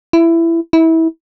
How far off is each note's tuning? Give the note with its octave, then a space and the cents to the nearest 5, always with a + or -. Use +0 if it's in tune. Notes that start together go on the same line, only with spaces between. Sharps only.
E4 +15
E4 -25